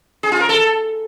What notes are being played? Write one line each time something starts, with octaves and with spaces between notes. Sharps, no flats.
G#4
F4
A#4
A4